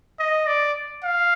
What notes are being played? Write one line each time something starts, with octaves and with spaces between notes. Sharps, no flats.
D#5
D5
F5